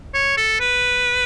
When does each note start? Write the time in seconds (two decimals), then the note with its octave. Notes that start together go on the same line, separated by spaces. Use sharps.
0.14 C#5
0.37 A4
0.60 B4